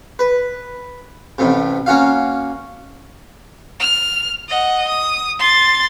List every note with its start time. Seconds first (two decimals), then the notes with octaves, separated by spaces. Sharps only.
0.19 B4
1.38 A1 A2 C3
1.86 A#3 C#4 F#4 F5
3.80 F6
4.49 D#5 F#5
4.88 D#6
5.39 C6 A6